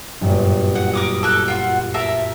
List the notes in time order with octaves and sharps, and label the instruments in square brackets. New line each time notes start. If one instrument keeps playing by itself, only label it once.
[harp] G1 F#2 A#2
[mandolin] F#5
A#4 D6 D#6
A4 A#4 F#6
F4 F#5
A#4 E5 A5